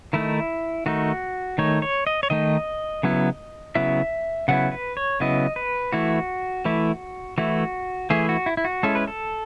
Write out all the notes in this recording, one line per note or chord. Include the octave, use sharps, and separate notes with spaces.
D#3 A3 D#4 E4
D#3 A3 D#4 F#4
D#3 A3 D#4 C#5
C#5
D#5
C#5
D#3 A3 D#4 D#5
C#3 F#3 B3 E4
C#3 F#3 B3 E4 E5
C#3 F#3 B3 E4 F#5
B4
C#5
C#3 F#3 B3 E4 D#5
B4
E3 A3 E4 F#4
E3 A3 E4
E3 A3 E4 F#4
E3 A3 E4 G#4
F#4
E4
E4
F#4
G#3 C#4 E4 A4
B4
A4